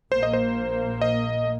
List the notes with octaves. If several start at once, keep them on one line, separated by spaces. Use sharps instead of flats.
A#1 A#2 A#3 C5
D#5
C5
D#5